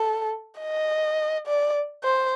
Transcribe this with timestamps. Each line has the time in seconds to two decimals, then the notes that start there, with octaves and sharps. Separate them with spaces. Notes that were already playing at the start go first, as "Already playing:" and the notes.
Already playing: A4
0.60 D#5
1.47 D5
2.04 C5